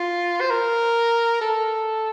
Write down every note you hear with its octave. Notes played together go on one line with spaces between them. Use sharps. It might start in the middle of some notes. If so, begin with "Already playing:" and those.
Already playing: F4
C5
A#4
A4